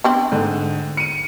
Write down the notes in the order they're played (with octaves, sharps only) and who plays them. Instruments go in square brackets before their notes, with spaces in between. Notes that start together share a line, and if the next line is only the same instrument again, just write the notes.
[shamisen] B3 C4 D4
[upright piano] G#2 D3
C#7 D#7